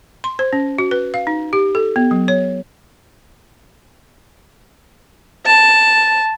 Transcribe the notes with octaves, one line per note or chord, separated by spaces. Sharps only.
C6
C5
C#4
F#4
B4
F5
D#4
G4
A4
B3
F#3
C#5
A5